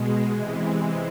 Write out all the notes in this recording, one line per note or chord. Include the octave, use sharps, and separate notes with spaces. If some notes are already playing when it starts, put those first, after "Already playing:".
Already playing: B2 G#3
C3 E3 G#3